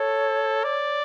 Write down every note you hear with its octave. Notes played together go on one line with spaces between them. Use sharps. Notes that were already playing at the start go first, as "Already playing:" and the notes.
Already playing: A4 C#5
D5